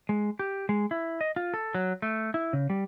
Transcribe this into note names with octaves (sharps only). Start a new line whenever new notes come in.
G#3
G4
G#3
E4
D#5
F4
A4
F#3
A3
E4
C#3
G3